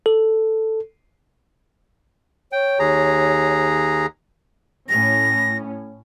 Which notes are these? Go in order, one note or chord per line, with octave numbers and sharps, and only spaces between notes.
A4
C#5 G5
D#2 G#4 A#5
A2 C#4 A#6